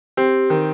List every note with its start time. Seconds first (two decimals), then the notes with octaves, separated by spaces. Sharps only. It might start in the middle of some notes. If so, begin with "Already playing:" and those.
0.17 C4 G4
0.50 D#3